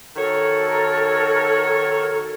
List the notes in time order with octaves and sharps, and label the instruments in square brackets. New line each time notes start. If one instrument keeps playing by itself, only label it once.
[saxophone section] D#3 F#4 C#5 [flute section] A4 A#4